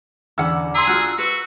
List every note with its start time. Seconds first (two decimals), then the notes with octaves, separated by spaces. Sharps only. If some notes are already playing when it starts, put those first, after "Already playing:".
0.38 E2 D3 C#4 F#5 B5 E6
0.75 G#4 A#5 C6 E6
0.87 D4 F4 F#4
1.18 F#4 B4